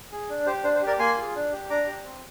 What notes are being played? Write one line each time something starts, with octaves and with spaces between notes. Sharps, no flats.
G#4
D4
G4 C5
D4 C5
C5
G4
A#4 D5
A#3 G#5 C6
F4 G#4
D4
G4
D4 A#5 D6
G4
C4